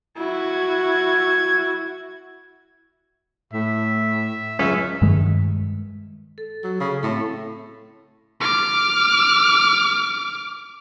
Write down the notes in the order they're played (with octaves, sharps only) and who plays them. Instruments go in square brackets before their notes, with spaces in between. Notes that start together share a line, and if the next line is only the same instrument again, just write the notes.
[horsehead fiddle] E4 F#4 [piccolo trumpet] G#6
[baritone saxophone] A2 [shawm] E5
[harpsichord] C#2 F#2 F#3 [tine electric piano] C#4 [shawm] E5
[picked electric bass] G2 D#3 G#3
[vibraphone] A4
[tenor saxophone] F#3
C#3
[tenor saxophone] A2 [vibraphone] C4 A4
[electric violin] D6 F6